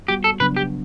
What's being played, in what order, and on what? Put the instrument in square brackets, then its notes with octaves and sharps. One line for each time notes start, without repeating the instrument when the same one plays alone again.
[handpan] G3 B3 F#4 [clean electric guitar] G4
[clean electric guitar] A4
[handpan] C#3 F#3 B3 D4 [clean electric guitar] B4
[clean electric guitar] G4